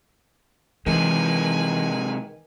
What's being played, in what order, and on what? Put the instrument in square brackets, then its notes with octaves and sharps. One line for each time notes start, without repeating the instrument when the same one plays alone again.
[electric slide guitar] C3 G#3 [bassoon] D#3 [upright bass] E3 [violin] B4 G#5